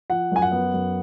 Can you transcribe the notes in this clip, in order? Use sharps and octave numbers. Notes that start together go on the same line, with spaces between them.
F3 F#5
F#2 G#5
F#5
B3
F#2